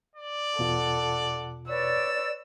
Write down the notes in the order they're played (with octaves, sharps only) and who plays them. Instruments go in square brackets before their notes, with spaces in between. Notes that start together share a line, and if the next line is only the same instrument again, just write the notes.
[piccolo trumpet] D5
[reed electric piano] E2 B2 F4 [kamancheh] A4 F#5
[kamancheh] B4 C#5 [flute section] D5 [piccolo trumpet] E6